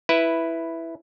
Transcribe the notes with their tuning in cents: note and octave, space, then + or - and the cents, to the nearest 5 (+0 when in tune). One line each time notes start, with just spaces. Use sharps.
E4 +0 B4 +0